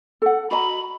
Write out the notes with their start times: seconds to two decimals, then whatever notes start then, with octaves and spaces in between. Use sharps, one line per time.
0.22 A4 F#5
0.51 F#4 D#5 A#5 B5